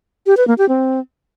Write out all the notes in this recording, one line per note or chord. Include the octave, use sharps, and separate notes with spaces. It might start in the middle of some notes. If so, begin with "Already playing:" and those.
G4
B4
A#3
G4
C4